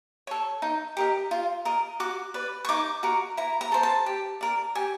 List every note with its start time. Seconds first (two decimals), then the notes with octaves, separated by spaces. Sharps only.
0.27 A4 C#5
0.62 D#4
0.97 G4 A#4 D#5
1.31 F4
1.65 A#4 D#5
2.00 F#4 D6
2.34 B4 D5
2.65 C#6
2.69 D#4 D6
3.03 F#4 A#4
3.37 E4 A#5
3.61 A#5
3.72 A4 C5
3.83 A5
4.06 G4
4.41 A#4 D5
4.75 G4 G#5